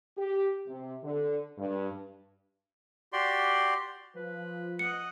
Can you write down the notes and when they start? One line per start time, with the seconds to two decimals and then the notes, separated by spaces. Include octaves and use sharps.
0.18 G4
0.68 C3
1.04 D3
1.58 G2
3.13 F#4 G4 D5 C6
4.16 F3 B4
4.79 D#5 F#5 C#7